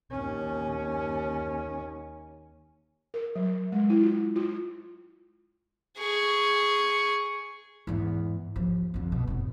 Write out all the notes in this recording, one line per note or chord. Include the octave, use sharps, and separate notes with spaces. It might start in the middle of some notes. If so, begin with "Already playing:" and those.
D#2 C#4
A#4
F#3
G#3
E4
F4
F4
G#4 C#6
E2 G#2
D#2 F3
F2 D3
B2
F1 A2